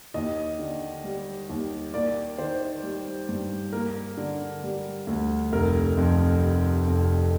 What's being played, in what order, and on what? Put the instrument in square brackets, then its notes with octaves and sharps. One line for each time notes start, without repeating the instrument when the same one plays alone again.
[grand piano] D#2 D#5
D3
G3
D#2
A#3 D5
D#3 C5
G3
G2
A#3 A#4
D3
G3
D2
F1 A#4
F2
C3
F1